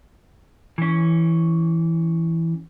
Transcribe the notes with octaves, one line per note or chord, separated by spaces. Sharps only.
E3 C#4